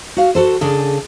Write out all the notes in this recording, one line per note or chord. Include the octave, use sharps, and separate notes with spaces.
F#4 F5
F#4 A4 C5
C#3 D4 G#4 A4